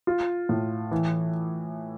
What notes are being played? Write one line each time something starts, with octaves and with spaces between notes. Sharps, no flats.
F4
A2
E3